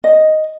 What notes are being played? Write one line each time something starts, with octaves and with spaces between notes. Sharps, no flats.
D#5